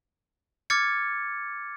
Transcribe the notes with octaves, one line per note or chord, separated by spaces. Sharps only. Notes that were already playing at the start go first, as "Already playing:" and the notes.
D6 F6 G#6 A6 C#7